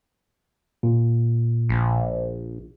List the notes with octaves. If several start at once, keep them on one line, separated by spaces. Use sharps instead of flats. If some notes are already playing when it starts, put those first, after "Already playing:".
A#2
A#1